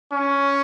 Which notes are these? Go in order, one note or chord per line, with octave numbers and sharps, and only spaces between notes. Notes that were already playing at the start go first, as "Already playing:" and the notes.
C#4